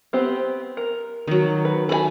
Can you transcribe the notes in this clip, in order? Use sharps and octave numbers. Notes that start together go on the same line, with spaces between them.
B3 C4 G4
A#4
D#3 F#3
B4
A4 A#4 G#5 B5